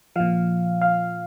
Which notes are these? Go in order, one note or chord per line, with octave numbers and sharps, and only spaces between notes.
A#2 F3 F5
F5